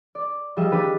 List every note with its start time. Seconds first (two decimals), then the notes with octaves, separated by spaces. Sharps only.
0.15 D5
0.56 F3 G3 G#4 D#5 E5
0.70 D#3 D4 G4 B4 A6